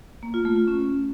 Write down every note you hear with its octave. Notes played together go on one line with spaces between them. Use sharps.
A#3
F4
A3
F4
C#4